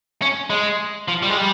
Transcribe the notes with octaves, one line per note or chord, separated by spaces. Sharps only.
C#4
G#3
F3
G3
G#3
G3